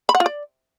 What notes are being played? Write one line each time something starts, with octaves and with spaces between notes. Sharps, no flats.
B5
F#5
F4
D5